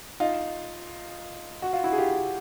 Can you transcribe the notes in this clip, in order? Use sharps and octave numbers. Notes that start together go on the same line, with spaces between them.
D#4 F4
F#4
F4
E4 F#4
G#4
F4 G4